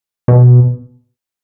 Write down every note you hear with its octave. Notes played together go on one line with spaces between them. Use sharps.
B2